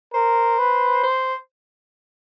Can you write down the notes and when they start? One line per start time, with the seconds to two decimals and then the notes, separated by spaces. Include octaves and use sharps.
0.14 A#4 C5
0.59 B4
1.03 C5